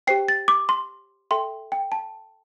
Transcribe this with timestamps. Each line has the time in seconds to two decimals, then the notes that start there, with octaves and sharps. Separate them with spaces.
0.07 G4 C5 G5 C7
0.28 A6
0.48 D6
0.69 C6
1.31 A4 E5 G5 C6
1.72 G5
1.92 A5